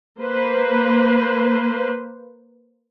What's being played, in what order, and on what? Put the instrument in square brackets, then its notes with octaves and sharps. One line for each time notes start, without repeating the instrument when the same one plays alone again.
[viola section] A#3 B4 C5